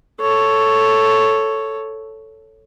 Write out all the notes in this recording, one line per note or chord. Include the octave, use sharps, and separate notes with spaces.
A4 C#5